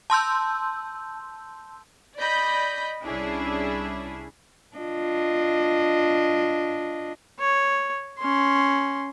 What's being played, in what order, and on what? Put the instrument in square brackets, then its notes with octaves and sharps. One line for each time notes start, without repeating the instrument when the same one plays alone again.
[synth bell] A5 C6 E6 G6
[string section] D5 D#5 B5 G6
C2 C#4 D4 E4 G#4
[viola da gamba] D4 F4 D#5
[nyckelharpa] C#5
C#4 C6